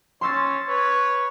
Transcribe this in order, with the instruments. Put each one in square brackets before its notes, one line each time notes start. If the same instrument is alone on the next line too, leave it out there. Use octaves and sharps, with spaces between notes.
[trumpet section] C#4 C#5 [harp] C6 E6 A6
[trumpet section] B4 C#5